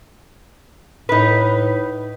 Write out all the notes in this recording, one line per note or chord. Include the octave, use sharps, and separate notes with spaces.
A2 D#4 B4